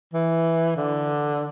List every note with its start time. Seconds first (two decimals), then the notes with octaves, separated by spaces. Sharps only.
0.14 E3
0.76 D3